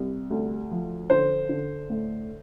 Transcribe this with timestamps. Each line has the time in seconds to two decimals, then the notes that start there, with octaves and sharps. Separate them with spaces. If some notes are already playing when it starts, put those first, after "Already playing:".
Already playing: C2
0.31 D2
0.71 F3
1.10 D3 C5
1.49 D3
1.90 A2